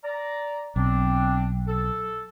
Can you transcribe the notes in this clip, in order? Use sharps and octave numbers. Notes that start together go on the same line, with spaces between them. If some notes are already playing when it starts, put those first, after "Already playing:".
D5 A#5
B1 C4 D4
A4